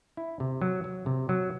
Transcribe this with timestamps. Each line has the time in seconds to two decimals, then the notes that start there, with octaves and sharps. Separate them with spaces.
0.17 E4
0.40 C3
0.61 F#3
0.84 F#3
1.06 C3
1.29 F#3